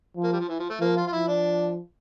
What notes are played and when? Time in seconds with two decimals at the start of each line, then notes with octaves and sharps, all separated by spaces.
0.16 F3
0.24 A#3
0.33 G3
0.40 F3
0.49 E3
0.60 F3
0.70 A3
0.80 F3 A#3
0.97 F4
1.07 F4
1.12 F3 E4
1.28 D4